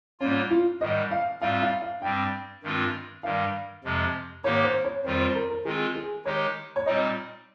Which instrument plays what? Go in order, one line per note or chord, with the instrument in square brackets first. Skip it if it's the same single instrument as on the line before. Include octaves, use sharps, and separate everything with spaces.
[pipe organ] G#2 G3 A#3 F4 [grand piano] C#4
[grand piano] F4
[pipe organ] G#2 D#3 G3 [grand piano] D#5
[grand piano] F5
[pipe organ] G#2 G3 C4 F4 [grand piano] F5
[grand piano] F5
F5
[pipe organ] G2 G3 C4 [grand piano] G5
[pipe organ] G2 D#3 G#3 C4 F4
[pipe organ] G2 D#3 G3 [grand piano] F5
[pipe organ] F2 C3 F3 G#3
[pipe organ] G#2 D#3 A#3 D#4 G4 [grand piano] C#5
[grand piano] C5
C#5
[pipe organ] F2 D#3 G3 C4 F4 [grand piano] C5
[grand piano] C5
A#4
A#4
[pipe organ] D#3 G#3 C4 F4 [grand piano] G#4
[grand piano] G#4
[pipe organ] D#3 G#3 D#4 G4 [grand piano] C#5
[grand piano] C#5
[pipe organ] A#2 G3 C4 D#4 [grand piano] D#5